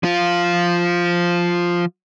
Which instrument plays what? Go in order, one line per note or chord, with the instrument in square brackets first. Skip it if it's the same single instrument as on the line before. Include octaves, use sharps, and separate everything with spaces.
[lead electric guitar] F3 F4